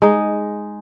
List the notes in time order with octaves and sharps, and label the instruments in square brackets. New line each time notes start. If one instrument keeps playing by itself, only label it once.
[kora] G#3 D#4